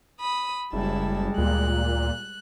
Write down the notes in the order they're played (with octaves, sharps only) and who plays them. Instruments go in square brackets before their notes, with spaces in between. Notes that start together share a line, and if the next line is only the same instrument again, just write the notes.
[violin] B5 D#6
[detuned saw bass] F#1 [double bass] G3 G#3 [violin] E4 A5
[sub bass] D2 [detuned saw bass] A#2 [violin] F#6